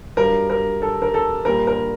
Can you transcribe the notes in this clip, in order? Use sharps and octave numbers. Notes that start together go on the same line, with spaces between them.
G2 F#3 A#4
A#4
A4
A#4
A4
A#2 G3 A#4
A#4